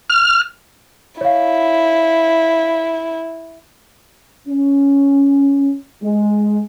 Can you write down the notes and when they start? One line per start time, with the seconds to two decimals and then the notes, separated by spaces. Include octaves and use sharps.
0.10 F6
1.21 E4 C#5 F5
4.48 C#4
6.03 G#3